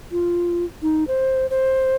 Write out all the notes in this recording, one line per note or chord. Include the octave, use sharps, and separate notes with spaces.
F4
D#4
C5
C5